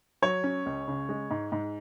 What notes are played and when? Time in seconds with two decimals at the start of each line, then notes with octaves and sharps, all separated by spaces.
0.22 F#3 C#5
0.44 C#4
0.66 C#2
0.88 C#3
1.09 G#3
1.31 G#2
1.52 G#2